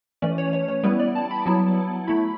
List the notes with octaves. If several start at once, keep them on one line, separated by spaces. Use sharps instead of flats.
E3 A3 C#4 D5
C#5
C#5
C#5
G3 B3 E4 B4
D5
A5
B5
F#3 B3 E4 A5
F#3 A3 E4 B5